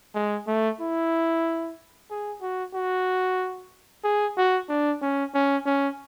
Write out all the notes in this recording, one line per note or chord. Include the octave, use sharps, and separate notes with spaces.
G#3
A3
E4
G#4
F#4
F#4
G#4
F#4
D4
C#4
C#4
C#4